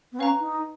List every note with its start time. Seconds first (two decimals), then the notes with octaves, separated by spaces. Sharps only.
0.12 B3
0.19 C#4 B4 F5 A#5
0.40 D#4